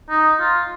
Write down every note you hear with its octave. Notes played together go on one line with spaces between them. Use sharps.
D#4
F4